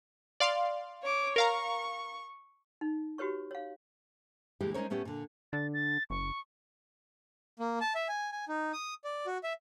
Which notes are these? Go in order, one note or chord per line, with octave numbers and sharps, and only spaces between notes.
D5 F5 C6
C#5 D6
A#4 F5 A#5 C#6
D#4
F#4 G4 B4 C#5 C#6
C#5 F5
D2 A#2 E3 G#3 G4
G#3 C#4 D#4 A#4 C5 C#5
A2 A3 B3 C#4 G4
A#2 D3
D3 A6
A6
F#1 C#6
A#3
A5
E5
G#5
G#5
D#4
D#6
D5
F#4
E5